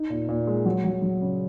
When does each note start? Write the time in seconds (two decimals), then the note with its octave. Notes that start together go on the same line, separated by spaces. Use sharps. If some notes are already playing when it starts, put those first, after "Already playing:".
Already playing: D#4
0.10 A#2
0.29 A#2
0.47 G#3
0.66 F#3
0.84 F#3
1.02 F#3
1.21 C#3